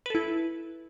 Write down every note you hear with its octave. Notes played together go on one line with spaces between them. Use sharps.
E4 A4 B4